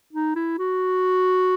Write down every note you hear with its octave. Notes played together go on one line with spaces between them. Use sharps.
D#4
E4
F#4